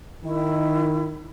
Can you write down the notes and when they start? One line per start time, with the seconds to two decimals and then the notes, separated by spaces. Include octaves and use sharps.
0.24 D#3 E4